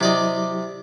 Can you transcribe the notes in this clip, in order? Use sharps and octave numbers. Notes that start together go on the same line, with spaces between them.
C3 F#3 E4 G4 D5 D#5